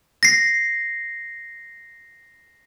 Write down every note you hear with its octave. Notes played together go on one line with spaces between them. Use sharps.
A#6 C7